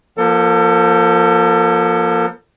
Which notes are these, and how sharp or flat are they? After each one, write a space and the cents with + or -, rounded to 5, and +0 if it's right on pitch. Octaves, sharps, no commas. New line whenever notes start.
F3 +0 A#3 +35 A4 +35